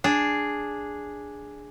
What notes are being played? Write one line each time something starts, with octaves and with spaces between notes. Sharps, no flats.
D4 G#4